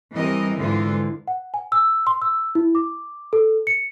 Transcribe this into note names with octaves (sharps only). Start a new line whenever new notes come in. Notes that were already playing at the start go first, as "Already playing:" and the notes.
E3 G3 C4 A#4 D#5
G#2 D3 E3 G#3 F4
F#5
G#5
E6
C6
E6
E4
D6
A4
C#7